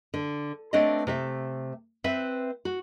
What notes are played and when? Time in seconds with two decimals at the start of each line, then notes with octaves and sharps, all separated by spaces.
0.14 D3
0.73 A3 C4 D4 B4 C#5 D#5
1.07 C3 A3 E5
2.04 C4 B4 E5
2.65 F#4